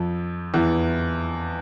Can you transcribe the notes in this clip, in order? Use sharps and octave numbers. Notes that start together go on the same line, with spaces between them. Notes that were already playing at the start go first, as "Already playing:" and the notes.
Already playing: F2 F3
E2 E3